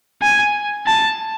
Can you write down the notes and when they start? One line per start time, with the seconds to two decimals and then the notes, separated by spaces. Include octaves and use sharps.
0.22 G#5
0.86 A5